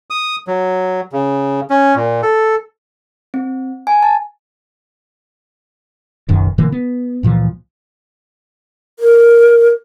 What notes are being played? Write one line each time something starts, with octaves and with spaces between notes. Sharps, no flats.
D#6
F#3
C#3
C#4
A#2
A4
C4
G#5
A5
F#1 B1 F#2 D#3
B2 D3 E3 A#3
B3
C#2 A#2 E3 F3
A#4